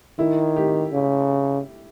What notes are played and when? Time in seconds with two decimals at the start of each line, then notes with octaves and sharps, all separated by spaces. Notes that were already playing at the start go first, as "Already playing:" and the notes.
0.19 D#3 E4
0.56 G4
0.93 C#3